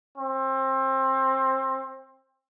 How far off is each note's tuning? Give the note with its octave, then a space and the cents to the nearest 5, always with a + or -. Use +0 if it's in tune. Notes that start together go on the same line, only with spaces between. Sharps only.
C4 +25